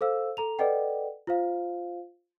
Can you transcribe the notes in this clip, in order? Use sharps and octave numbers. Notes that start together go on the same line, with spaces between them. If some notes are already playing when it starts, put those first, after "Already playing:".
A4 C5 F5 E6
A4 A#5 F7
A4 B4 D5 D#5 F#5 G5
F4 C5 F5